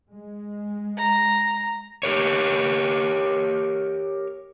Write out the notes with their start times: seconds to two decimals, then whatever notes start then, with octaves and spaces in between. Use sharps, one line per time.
0.11 G#3
0.97 A#5
2.03 G4 A#4 C#5